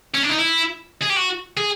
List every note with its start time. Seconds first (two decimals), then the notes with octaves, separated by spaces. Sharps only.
0.14 C#4
0.23 D4
0.29 D#4
0.38 E4
1.02 G#4
1.10 G4
1.16 F#4
1.57 G#4